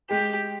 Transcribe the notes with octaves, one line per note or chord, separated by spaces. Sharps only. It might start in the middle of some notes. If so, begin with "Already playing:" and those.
G#3 G4